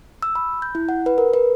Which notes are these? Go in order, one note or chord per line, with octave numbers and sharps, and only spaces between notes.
E6
B5
G6
E4
F#5
B4
A#4
B4